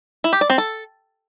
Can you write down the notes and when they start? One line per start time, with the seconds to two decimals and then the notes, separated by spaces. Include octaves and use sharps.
0.24 E4
0.33 G4
0.41 D5
0.50 C4
0.58 A4